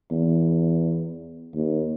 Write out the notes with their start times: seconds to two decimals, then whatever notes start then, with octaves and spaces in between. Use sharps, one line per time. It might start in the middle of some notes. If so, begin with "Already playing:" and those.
0.11 E2
1.54 D#2